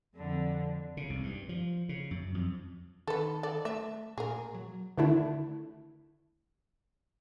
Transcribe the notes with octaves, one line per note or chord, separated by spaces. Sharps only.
F2 D3
C#3
C2
G2
F3
C#3
F#2
F2
D#3 A4 B4
A4 D5
A3 E5
A#2 G#4 A#4
F#3
D3 D#3 A3 D4 E4